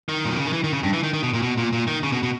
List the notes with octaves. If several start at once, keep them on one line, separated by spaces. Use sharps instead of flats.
D#3
A#2
B2
C#3
D#3
E3
D#3
C#3
G2
E3
D#3
D#3
B2
A#2
B2
A#2
A#2
D#3
C#3
B2
B2